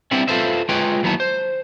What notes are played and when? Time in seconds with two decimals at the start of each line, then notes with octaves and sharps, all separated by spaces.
0.11 G3 B3 C4 D4 E4
0.28 F4 A4 B4 C5 E5
0.69 G#3 F4 B4 C#5 G5
1.03 D#2 F#3 B3 E4 A5
1.20 C5